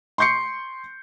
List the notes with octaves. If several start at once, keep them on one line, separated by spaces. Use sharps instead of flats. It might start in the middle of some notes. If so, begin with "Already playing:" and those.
C6 C#6 G6 C7 C#7